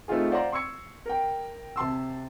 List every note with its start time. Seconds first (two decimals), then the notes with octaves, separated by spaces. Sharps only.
0.08 A3 C4 D#4 F4 G#4
0.31 C5 D5 F5 F#5 A#5 C6
0.52 C6 C#6 E6 G#6 C#7
1.06 A#4 G5
1.76 C3 A5 C6 E6